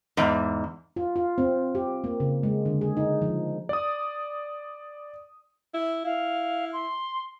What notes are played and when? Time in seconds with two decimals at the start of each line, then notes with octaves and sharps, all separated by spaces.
0.17 E2 G#2
0.96 F4
1.16 F4
1.38 C4
1.75 G4
2.04 A#3
2.20 C#3
2.43 G#3
2.66 D3
2.81 G#4
2.97 D#4
3.22 F3
3.69 D5 D#6
5.74 E4
6.05 E4 F5
6.73 C6